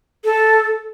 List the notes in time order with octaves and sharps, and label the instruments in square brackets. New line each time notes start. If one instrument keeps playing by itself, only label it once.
[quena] A4